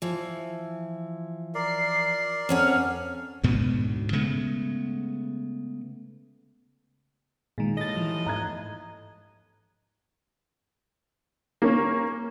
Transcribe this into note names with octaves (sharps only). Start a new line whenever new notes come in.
E3 F3
A#4 D5 C7
F2 C#4 F#5 F6
D2 G#2 B2 B3
C#3 G#3 A3 B3
A#2 D#3 G#3
D#2 A2 D#5 A6 A#6
E3 F3
G#2 A#5 F#6 G#6
A#3 C#4